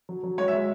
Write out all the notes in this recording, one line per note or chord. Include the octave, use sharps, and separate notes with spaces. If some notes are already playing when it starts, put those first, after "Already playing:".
F#3
F#3
G#3 C#5
E5
G#3